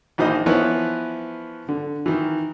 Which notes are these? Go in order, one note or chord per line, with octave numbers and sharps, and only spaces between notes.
A#1 D#3 E3 C5 D#5
E3 F3 B3 E4 B4 C#5
D3
D#3 E3